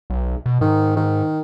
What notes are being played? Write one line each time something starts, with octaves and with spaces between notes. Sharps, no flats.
B1
B2
G#2 D#3
D#3